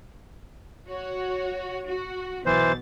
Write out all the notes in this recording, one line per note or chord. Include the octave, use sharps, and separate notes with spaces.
F#4 C#5
F#4
B1 B2 E3 C5 A6